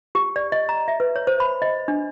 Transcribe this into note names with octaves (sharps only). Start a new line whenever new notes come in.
G4
D5
D#5
A#5
E5
B4
C#5
C5
B5
D#5
D4